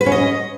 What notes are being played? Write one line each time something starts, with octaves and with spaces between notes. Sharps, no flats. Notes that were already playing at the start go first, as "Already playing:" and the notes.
B4
C#4
D#5